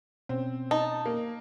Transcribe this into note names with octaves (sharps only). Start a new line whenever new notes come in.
B2 C4 C#4
D#4 A5
A#3